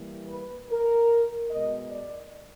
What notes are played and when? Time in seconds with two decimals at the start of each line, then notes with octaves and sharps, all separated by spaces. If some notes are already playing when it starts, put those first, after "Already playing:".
Already playing: E3 G3 A#3
0.29 B4
0.70 A#4
1.51 B2 G#3 B3 D#5
1.91 D5